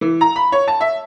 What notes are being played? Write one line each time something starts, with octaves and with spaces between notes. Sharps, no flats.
E3
A#5
B5
C#5
A5
E5